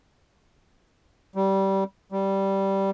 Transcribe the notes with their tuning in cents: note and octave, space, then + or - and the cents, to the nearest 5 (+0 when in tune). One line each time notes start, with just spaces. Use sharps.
G3 -20
G3 -10